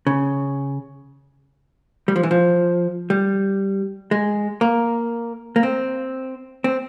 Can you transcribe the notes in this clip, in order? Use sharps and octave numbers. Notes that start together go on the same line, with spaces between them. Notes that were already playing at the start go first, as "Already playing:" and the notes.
C#3
G3
F3
E3
F3
G3
G#3
A#3
A#3
C4
C4